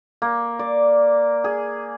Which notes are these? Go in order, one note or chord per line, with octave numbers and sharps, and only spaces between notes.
A#3
D5
G#4